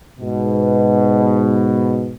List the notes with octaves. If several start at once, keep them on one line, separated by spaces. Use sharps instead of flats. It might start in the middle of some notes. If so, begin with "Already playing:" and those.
G#2 B2